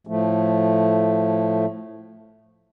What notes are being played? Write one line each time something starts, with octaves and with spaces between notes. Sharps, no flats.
A2 F3 A3